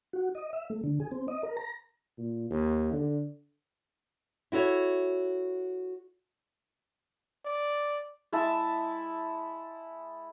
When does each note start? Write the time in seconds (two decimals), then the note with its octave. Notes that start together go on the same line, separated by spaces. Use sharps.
0.13 F#4
0.35 D#5
0.53 E5
0.70 A3
0.84 D3
1.00 G#4
1.11 C4
1.28 D#5
1.43 A#4
1.57 A#5
2.18 A#2
2.50 D#2
2.92 D3
4.52 E4 F#4 A4 C#5
7.45 D5
8.32 G#3 E4 E5 A5